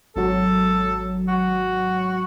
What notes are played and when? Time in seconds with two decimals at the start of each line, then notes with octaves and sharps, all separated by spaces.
0.16 G#1 F#3 A4
1.28 F#4